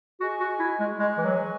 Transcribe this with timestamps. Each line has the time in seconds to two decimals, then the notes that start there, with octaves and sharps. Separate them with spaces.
0.20 F#4 G#4 D#5 G#5 C#6
0.40 F#4
0.59 E4
0.80 G#3
0.99 G#3 G#4 D#5 G#5 C#6
1.18 E3
1.25 F#3